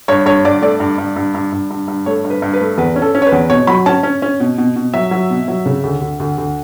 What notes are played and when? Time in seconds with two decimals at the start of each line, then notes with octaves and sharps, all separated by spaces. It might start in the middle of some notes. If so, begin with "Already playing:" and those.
0.08 G2 C#5
0.26 G2 C#5
0.45 G2 D5
0.62 A3 D5
0.80 G2
0.98 G2
1.16 G2
1.34 G2
1.52 G2
1.71 G2
1.88 G2
2.06 A3 C#5
2.25 G2
2.30 B4
2.42 G2
2.54 B4
2.60 A3
2.77 E2 B4
2.96 C#4
3.02 A4
3.15 C#4
3.22 C#5
3.27 B4
3.32 E2
3.50 B2 C#5
3.67 F#3 B5
3.86 C#4 A5
4.03 C#4
4.22 C#4
4.40 B2
4.58 B2
4.76 B2
4.94 F#3 E5
5.11 F#3
5.30 B2
5.48 F#3
5.66 C#3
5.84 D2
6.01 D2
6.20 D2
6.38 D2